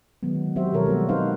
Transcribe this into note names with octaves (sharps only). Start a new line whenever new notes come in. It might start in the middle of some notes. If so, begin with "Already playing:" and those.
D#3 F#3 G#3 B3
D#3
F#3 C4 F#4 G4 C5 E5
B2 D#3 F3 A4 A#4 C#5
G3 G#3 B3 F#4
G#3 C4 D#4 B4 C5 F5